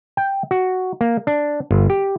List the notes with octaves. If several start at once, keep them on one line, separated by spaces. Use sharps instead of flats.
G5
F#4
A#3
D4
G1
G4